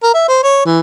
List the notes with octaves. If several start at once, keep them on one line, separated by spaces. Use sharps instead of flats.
A#4
E5
C5
C#5
E3